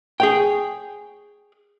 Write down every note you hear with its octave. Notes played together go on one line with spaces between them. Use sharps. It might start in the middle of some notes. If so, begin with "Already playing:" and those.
G#4 C#5 G5